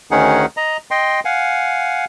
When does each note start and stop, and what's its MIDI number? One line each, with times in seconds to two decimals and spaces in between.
0.11 0.46 38
0.11 0.46 51
0.11 0.46 61
0.11 0.46 63
0.11 0.46 68
0.11 0.46 78
0.57 0.77 75
0.57 0.77 82
0.91 1.20 75
0.91 1.20 79
0.91 1.20 84
1.25 2.05 77
1.25 2.05 78
1.25 2.05 80